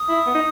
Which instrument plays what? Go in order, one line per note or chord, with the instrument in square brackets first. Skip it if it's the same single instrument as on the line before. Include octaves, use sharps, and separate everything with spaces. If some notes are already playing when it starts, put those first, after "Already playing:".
Already playing: [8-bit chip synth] D#6
[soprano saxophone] E4
B3
D#4